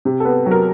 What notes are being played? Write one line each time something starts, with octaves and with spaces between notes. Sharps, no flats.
C3
A4
B3
F#3
A#4